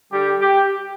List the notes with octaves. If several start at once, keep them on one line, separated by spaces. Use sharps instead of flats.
D3 G3 G4
G4